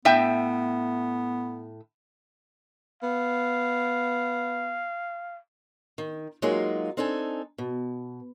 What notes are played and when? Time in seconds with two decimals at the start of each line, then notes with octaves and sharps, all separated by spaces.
0.05 A2 B3 E5 G5
3.03 B3 F5
5.98 D#3
6.42 F#3 G#3 A#3 D#4 F4 G#4
6.97 C4 D4 D#4 A4 G#5
7.58 B2